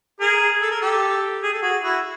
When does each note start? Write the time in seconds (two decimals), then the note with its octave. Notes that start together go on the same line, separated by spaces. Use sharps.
0.20 G#4 A#4
0.62 A4
0.71 A#4
0.82 G4 A4
1.43 G#4
1.53 A4
1.62 F#4 G#4
1.83 E4 F#4